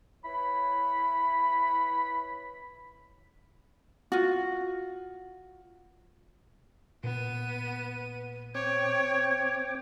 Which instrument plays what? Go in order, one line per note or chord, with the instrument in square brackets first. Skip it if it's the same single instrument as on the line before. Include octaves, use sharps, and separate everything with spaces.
[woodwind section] E4 B4 C#5 B5
[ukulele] F4 F#4
[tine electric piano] A#2 [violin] B3 D#7
[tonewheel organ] C4 G5 D6 [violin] C#5 [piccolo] G#6